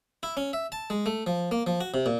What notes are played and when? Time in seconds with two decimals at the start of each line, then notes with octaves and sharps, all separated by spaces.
0.23 E4
0.37 C#4
0.53 E5
0.72 A5
0.90 G#3
1.06 A3
1.27 F3
1.51 A#3
1.67 F3
1.81 F#4
1.94 C3
2.06 A#2